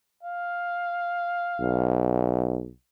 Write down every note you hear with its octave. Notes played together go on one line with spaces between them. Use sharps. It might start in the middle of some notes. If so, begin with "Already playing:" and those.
F5
B1